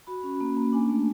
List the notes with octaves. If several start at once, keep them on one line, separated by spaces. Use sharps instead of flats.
F#4 B5
C#4
A#3
A#3
D4 G#5
A3